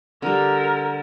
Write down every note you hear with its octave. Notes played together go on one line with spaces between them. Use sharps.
D3 G3 A#4